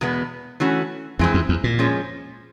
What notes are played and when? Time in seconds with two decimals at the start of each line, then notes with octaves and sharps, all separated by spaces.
0.01 E2 B2 G#3 B3
0.60 E3 A3 C#4 F#4
1.19 F2 E3 G#3 C4
1.34 F2
1.49 E2
1.64 A#2
1.79 F3 G#3 C#4